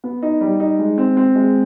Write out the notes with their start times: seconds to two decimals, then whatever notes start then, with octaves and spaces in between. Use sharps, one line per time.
0.04 B3
0.23 D#4
0.41 G3
0.60 D#4
0.79 G#3
0.98 C4
1.17 C4
1.35 G#3